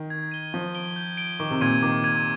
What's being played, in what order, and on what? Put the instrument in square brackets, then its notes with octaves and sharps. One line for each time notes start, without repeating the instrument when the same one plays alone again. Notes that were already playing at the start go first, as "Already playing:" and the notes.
Already playing: [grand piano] D#3
[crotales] G#6
D#7 G7
[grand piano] F3 [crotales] G6
[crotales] D7 G7
G6
D7 G7
[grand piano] D#3 [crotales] D6
[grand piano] C3
[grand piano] A#2 [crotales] G#6 D#7
[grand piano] D#3 [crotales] D6
[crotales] G#6 D#7